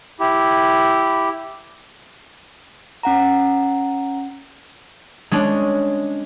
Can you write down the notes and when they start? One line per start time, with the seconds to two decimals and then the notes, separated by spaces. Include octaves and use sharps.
0.19 E4 G4
3.03 C#4 F#5 A#5
5.31 G#3 C#4 D4